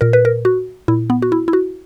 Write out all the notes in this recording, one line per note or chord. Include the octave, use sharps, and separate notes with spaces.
A#2 A#4
B4
A#4
F#4
A#2 E4
B3
F#4
E4
E4
F#4